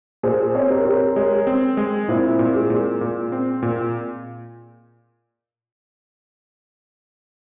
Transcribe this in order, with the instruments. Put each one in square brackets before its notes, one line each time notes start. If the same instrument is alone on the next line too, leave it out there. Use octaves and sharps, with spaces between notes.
[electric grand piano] A#2 [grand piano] G#4 C5
[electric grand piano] C4 [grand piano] C#5
[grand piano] A#4 C#5
[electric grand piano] C4 [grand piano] A#4 C#5
[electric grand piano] G#3 [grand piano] A#4 C#5
[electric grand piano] C4
G#3
[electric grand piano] A#2 [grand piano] C4 E4
[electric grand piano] A#2
[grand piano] G#3
[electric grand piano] A#2
A#2
C4
A#2